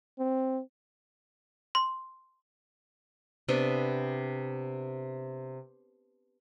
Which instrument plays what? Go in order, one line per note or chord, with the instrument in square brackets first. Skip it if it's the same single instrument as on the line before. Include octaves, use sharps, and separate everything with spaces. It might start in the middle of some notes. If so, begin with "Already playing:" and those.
[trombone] C4
[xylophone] C6
[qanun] C3 B3 D4